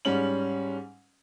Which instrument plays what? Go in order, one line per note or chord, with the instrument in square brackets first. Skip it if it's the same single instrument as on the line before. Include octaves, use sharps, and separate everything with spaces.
[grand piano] G#2 G3 C#4 F#7